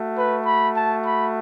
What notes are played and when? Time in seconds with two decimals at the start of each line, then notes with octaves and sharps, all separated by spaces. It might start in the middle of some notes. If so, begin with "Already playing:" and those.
Already playing: A3 F#4
0.15 B4
0.44 B5
0.74 A5
1.04 B5